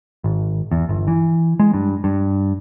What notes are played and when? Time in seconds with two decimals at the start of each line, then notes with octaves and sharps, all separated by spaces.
0.24 G#1
0.72 E2
0.89 G1
1.07 E3
1.60 G#3
1.74 G2
2.04 G2